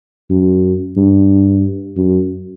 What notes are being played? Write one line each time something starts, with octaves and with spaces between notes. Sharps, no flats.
F#2
G2
F#2